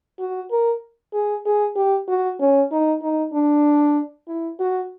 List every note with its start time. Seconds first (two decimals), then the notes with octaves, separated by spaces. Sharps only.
0.19 F#4
0.51 A#4
1.13 G#4
1.46 G#4
1.76 G4
2.08 F#4
2.40 C#4
2.72 D#4
3.02 D#4
3.33 D4
4.28 E4
4.60 F#4